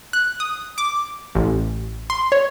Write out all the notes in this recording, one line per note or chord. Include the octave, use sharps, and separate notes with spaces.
F#6
D#6
D6
A1
C6
C#5